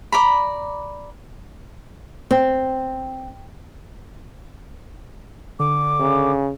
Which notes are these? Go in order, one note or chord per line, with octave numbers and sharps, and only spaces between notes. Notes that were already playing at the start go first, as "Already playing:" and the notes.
D5 A#5 B5
C4
D3 D6
C#3